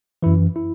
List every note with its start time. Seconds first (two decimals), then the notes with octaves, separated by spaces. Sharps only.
0.23 F#2 E3 E4
0.56 E4